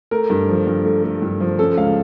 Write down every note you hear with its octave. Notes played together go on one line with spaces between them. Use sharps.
A3 A#4
G2
F3
G2
A3
A3
G2
F3
C#4 A4
C#2 F5